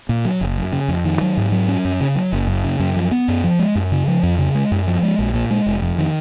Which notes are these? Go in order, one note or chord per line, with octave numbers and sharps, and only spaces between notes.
A#2
F#3
F#1
F#2
C#3
F2
D#3
F#3
G#2
F#3
C#4
F#2
C#3
F#3
F#1
F#2
C#3
F#2
F3
B3
F#2
F3
G#3
F#2
C#3
F3
F2
C#3
G#3
F#2
F3
G#3
A#1
A#2
G#3
F1
F2
D#3